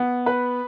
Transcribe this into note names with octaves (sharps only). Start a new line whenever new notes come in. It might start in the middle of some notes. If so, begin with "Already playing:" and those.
Already playing: B3
B4